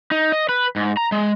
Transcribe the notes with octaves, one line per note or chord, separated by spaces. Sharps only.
D#4
D#5
B4
G#2
A#5
G#3